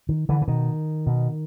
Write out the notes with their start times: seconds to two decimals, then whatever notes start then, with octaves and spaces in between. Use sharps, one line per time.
0.09 D#3
0.29 D3 E3
0.42 E3
0.48 B2 D#3
1.07 B2